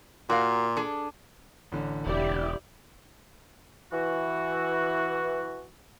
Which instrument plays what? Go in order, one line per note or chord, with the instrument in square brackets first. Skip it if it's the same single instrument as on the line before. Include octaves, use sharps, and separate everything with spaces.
[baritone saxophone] A#2 [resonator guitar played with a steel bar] F#4 A#4 F5
[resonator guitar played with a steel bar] D4 G#4 A4
[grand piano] A1 D3
[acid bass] E1 [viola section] E4 G4 D5
[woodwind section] E3 F#4